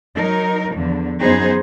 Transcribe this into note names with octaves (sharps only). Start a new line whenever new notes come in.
F#3 D#4 A#4
E2 D3 F3
F#2 B3 D#4 G#4 C5